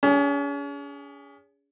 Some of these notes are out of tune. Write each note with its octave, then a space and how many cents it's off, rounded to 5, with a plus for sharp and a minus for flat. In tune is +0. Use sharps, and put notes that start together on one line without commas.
C#4 +40 G#4 -20